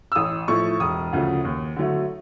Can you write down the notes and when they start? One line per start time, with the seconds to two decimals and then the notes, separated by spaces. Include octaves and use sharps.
0.12 E6
0.15 A1 D#6
0.48 A2 F3 A3 C#6
0.80 E1 D#6
1.13 D2 C#3 F3 A3
1.45 D#2
1.76 D3 F#3 A3